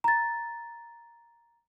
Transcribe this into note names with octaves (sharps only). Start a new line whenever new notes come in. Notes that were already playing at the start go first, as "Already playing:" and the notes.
A#5 A6